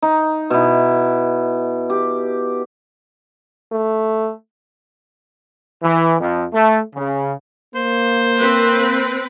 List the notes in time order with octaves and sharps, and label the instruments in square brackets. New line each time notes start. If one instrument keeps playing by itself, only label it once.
[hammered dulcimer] D#4
B2 E4
G4
[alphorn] A3
[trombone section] E3
F2
A3
C#3
[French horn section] A#3 [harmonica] C5
[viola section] C4 B4